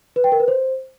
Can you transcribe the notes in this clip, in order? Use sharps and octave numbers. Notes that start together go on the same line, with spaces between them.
B4
G5
A#4
B4
C5